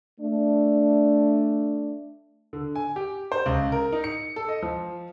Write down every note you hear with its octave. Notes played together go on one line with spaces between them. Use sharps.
A3 D4
D3
G#5
G4
C5
C#2
A#4
D#4
C#7
A4
D#5
F3